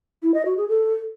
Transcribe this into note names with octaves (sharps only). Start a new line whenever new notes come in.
E4
D#5
F#4
G#4
A4